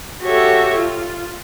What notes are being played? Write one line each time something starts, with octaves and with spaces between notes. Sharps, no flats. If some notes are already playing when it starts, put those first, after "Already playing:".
F#4 G4 A4 C#5 E5
F4